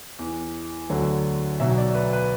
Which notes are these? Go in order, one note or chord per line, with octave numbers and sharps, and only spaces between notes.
E2 E3
D2 D3 F#3
B1 B2 F#3 E5
D5
B4
B4